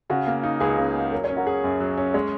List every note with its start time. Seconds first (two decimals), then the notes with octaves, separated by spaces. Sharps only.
0.10 C#3 F#4
0.27 A#3
0.43 D#4
0.60 C#2 G#4
0.78 C#3
0.95 A#3
1.12 F#3 A#4
1.24 C#5
1.29 C#4
1.37 F#4 A#4
1.47 G#4
1.64 F#2
1.80 F#3
1.98 C#4
2.14 G#3 G#4 C#5